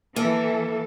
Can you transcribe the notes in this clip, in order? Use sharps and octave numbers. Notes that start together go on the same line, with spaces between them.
E3 A#3 A4